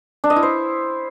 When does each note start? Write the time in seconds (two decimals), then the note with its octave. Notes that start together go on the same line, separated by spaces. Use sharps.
0.24 D4
0.30 D#5
0.36 E4
0.43 C5